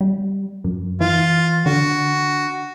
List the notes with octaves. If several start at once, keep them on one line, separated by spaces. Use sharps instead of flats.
G3
F#2
E3 F4
D3 F#4